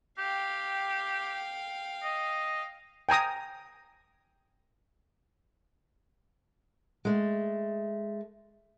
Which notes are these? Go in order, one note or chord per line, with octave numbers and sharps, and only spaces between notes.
G4 F5 G5
D#5
G5 G#5 A#5 D#6
G#3 A3